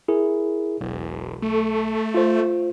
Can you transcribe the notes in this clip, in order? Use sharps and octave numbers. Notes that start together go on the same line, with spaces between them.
E4 G#4 A#4
E1 B1
A3
F4 C5